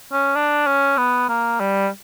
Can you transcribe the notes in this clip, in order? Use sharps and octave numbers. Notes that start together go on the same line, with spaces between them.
C#4
D4
C#4
B3
A#3
G3